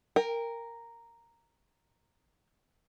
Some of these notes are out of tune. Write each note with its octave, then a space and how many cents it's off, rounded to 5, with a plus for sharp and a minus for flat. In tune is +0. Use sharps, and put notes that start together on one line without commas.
A#4 -5 G5 +30